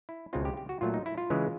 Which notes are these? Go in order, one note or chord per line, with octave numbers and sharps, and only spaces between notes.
E4
C#2 B2 G#3 C4 D#4 F4
G4
G4
F#4
A#2 F#3 A3 F4
D#4
E4
F4
C#3 E3 G#3